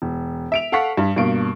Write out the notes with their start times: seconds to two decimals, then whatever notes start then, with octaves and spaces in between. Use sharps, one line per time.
0.02 E1
0.52 E5 D7 F7
0.72 A4 F5 F#5 C#6 B6
0.97 G2
1.16 G2 B2 A#3 D7